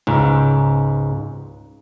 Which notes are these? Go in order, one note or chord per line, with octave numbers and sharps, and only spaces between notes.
C#2 G#2